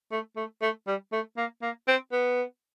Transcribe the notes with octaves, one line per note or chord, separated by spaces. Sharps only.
A3
A3
A3
G3
A3
A#3
A#3
C4
B3